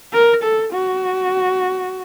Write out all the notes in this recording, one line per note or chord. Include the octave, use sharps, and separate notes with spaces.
A#4
A4
F#4